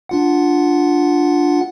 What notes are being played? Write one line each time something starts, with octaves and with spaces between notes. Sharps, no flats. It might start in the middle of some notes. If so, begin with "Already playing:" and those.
D4 F4 F#5